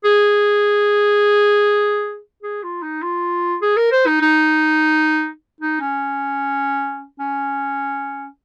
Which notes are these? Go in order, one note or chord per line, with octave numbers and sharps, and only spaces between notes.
G#4
G#4
F4
D#4
F4
G#4
A#4
C5
D#4
D#4
D#4
C#4
C#4